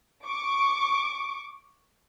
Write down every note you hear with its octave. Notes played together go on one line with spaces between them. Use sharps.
C#6 D6